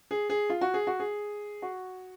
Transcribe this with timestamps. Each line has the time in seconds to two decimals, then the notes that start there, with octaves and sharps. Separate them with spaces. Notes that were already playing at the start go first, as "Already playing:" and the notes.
0.11 G#4
0.30 G#4
0.50 F4
0.61 F#4
0.74 G#4
0.87 F#4
1.00 G#4
1.62 F#4